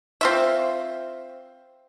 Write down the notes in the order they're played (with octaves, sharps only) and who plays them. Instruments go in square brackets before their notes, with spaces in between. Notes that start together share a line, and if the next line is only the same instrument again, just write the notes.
[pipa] C4 F4 E5